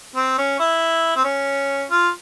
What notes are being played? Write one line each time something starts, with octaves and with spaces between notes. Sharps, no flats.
C4
C#4
E4
C4
C#4
F4